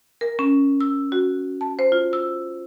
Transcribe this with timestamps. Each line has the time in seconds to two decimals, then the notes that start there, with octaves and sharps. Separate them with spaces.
0.21 A#4
0.39 C#4
0.81 E6
1.12 F#4
1.61 A5
1.79 C5
1.92 F4
2.13 E6